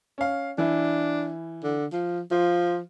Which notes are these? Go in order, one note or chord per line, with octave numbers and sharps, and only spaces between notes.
C#4 F5
E3 D4 E4
D3
F3
F3 F4